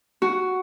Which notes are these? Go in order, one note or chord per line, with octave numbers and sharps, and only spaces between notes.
F#4